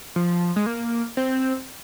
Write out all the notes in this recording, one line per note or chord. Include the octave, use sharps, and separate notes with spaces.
F3
G#3
A#3
C4